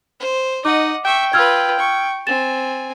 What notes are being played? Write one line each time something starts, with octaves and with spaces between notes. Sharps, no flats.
C5
D#4 D#5 F#5 D6
E5 G5 C#6
F4 B4 E6 F6 G#6
C#6
C4 G#5 A6 E7